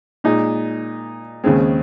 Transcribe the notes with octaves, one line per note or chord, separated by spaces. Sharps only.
A#2 G#3 D#4
D#2 C#3 G#3 C4